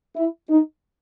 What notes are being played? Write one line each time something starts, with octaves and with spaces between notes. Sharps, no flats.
E4
D#4